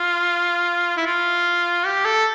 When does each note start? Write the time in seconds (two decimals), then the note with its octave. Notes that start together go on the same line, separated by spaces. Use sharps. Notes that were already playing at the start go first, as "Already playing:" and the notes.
Already playing: F4
0.97 E4
1.07 F4
1.86 G4
2.05 A4